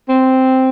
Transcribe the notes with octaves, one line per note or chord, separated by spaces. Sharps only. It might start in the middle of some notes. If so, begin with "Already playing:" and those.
C4